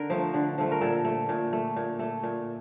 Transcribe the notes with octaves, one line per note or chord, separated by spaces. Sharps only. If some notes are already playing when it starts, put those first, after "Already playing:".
Already playing: D3 A#4
F3 A3
D3
F3 A3
A#4
A#2 A4
A3
A#2
A3
A#2
A3
A#2